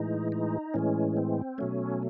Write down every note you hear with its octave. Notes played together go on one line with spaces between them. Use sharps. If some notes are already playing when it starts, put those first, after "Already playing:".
Already playing: A2 E3 G#3 D#4
D#4
A2 E3 G#3 C#4
C4
B2 F#3 A3 C#4